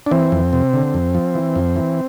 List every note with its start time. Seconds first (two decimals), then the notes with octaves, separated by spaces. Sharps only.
0.06 D4
0.11 E3 C4
0.32 F2
0.53 C3
0.74 D3
0.94 F2
1.15 F3
1.35 E3
1.56 F2
1.76 E3